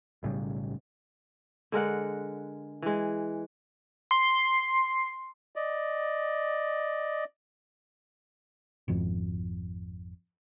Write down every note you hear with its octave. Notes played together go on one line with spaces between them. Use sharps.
B1 A2 C#3 G3
D3 G#3 A#4 F#5
E3 G#3
C6
D5 D#5
G#1 F2